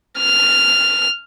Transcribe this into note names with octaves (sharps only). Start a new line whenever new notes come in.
F6